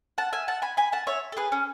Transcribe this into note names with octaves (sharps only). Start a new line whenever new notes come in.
F#5 A5
E5 G#5
F#5 A5
G#5 B5
G#5 B5
F#5 A5
C#5 E5
A4
G#4 B4
C#4